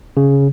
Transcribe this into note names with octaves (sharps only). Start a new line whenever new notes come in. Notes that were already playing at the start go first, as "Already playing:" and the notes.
C#3